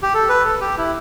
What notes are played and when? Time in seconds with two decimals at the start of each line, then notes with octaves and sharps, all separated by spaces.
0.03 G4
0.14 A4
0.29 B4
0.45 A4
0.61 G4
0.78 E4